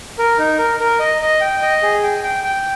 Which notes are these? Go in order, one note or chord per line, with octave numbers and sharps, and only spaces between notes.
A#4
D#4
A#4
A#4
D#5
D#5
G5
D#5
G#4
G5
G5
G5